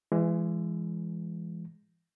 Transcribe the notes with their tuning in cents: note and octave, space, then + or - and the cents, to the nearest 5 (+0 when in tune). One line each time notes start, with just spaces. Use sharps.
E3 +30 G#3 +0